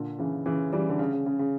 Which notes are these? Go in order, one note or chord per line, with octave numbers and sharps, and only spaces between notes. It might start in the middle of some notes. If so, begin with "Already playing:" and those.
Already playing: A#2 D3
C#3 E3
C#3 E3
E3 G3
D3
C#3
C#3
C#3
C#3